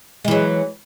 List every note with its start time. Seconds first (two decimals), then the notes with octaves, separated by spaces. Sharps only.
0.24 G#3
0.28 E3
0.31 F#3